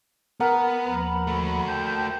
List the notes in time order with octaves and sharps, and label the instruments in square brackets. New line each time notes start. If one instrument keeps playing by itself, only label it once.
[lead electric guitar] B3 [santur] A#4 F#5
[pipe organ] D#2 F3 B5
[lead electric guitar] A3 F#4
[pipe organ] G5 A5 G6